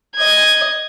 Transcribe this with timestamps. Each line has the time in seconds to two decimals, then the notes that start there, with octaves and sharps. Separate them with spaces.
0.16 D#5 G#6